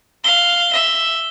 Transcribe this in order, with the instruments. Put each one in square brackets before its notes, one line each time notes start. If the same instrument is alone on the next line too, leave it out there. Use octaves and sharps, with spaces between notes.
[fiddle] F5 [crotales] G7
[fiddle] E5